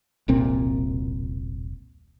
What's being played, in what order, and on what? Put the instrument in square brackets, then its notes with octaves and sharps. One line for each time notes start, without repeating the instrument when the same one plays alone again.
[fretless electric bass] E1 C2 A#2 C4